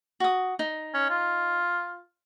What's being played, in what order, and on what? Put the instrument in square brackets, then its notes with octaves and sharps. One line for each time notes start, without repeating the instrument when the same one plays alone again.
[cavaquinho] F#4 D#6
D#4
[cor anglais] C#4
F4